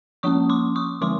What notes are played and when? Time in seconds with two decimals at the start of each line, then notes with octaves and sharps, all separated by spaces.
0.23 F3 A#3 C#4 C#6 D#6
0.50 C6 D6
0.76 C#6 D#6
1.01 D3 F3 G#3 C4 C6 D6